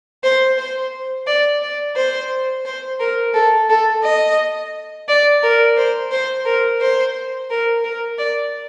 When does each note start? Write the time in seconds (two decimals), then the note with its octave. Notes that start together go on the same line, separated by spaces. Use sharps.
0.24 C5
0.58 C5
1.27 D5
1.62 D5
1.96 C5
2.66 C5
3.00 A#4
3.34 A4
3.70 A4
4.04 D#5
5.08 D5
5.43 A#4
5.77 C5
6.12 C5
6.46 A#4
6.81 C5
7.50 A#4
7.84 A#4
8.19 D5